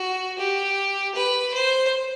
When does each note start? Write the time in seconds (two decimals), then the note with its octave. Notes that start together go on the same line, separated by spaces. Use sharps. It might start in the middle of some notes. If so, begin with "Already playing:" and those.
Already playing: F#4
0.38 G4
1.15 B4
1.54 C5